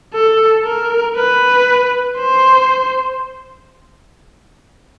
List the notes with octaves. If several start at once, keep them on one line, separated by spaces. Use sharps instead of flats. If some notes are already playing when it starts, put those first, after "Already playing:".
A4
A#4
B4
C5